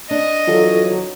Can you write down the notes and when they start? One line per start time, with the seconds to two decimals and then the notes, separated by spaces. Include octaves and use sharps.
0.11 D4 D#5
0.48 F2 E3 F#3 F4 F#4 A4